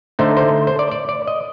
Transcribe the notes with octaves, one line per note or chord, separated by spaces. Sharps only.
D3 A3 D#4 C5
C5
C5
D5
D5
D5
D#5